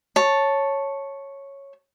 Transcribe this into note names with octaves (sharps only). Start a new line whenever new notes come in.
C#5 A5